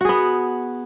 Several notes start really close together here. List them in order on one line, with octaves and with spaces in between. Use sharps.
F#4 G#4 B3